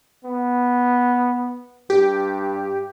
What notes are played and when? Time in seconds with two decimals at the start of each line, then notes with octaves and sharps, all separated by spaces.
0.24 B3
1.90 G2 G4